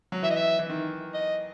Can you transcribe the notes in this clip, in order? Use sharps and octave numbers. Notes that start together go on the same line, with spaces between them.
F#3
E3 E5
D#5
E5
E3
D#3
D#5